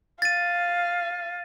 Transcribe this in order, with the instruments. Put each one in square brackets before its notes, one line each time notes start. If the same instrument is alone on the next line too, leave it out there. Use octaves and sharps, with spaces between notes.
[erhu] F5 [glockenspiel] A6 D#7